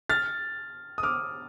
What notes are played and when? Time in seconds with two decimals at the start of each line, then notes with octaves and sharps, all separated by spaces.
0.10 F6 A6
0.98 D#6
1.03 D6 F6